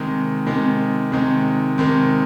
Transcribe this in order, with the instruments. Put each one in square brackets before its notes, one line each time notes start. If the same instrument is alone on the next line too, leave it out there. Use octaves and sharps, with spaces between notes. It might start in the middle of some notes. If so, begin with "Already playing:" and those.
Already playing: [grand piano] C3 D#3 G#3
C3 D#3 G#3
C3 D#3 G#3
C3 D#3 G#3